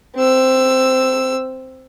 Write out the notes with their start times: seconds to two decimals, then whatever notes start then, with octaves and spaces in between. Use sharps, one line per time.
0.15 C4 E6